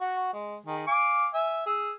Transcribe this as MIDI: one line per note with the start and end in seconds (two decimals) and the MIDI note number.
0.01 0.29 66
0.01 0.29 85
0.33 0.56 56
0.66 0.87 51
0.66 0.87 68
0.87 1.27 77
0.87 1.27 80
0.87 1.27 86
1.34 1.62 76
1.34 1.62 80
1.66 1.93 68
1.66 1.93 88